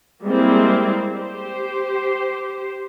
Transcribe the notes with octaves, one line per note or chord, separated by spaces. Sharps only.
G3 G#3 A#3 C4 E4
G4 C5